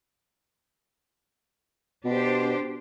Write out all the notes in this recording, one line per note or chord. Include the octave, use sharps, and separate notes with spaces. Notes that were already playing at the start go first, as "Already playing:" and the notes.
B2 D4 G4 C5